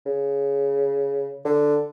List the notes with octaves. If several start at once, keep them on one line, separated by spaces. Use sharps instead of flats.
C#3
D3